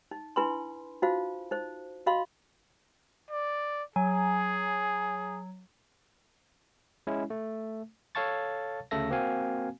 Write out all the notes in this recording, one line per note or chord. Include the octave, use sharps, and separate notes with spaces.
D#4
D4 E4 B4 G#5 B5 C6
D#4 F4 F#4 C5 F5
D#4 C5
F#4 D#5 F5 B5 C6
D5
F#3 G#4 G#5
G#3 C#4 E4
A3
A4 C#5 F5 A5 C#6 A6
D2 C#3 A3 A4 E5 A#6
A#3 C4 F#4 F5 G#5